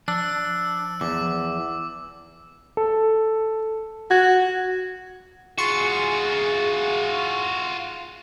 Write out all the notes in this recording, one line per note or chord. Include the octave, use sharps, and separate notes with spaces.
F3 D4 E6
E2 D6
A4
F#4 G#6
F4 F#4 G#4 C6 C#6